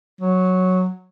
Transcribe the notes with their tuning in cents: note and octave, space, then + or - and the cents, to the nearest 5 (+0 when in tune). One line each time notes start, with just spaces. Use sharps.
F#3 -5